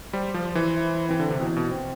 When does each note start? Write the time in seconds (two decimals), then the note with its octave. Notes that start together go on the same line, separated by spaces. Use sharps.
0.13 G3 C5
0.34 F3
0.45 C5
0.55 E3
0.77 E4
1.09 E3 C4
1.20 D3
1.31 C3
1.40 B2 E3
1.57 B2
1.71 C4